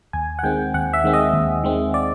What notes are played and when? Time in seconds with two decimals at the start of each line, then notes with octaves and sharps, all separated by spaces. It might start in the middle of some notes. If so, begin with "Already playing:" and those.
0.13 D#2 G#5
0.39 F#5
0.43 D#3 G#3 C4 G5
0.74 D#2 F#5
0.93 E5
1.04 D#3 G#3 C4
1.14 D#5
1.34 D#2
1.63 D#3 G#3 C4
1.94 D5